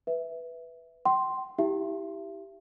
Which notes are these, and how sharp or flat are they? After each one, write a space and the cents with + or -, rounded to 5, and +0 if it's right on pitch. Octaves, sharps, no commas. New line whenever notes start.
B4 +0 E5 +0
G5 -35 C6 +0
E4 -25 G4 -5 E5 +35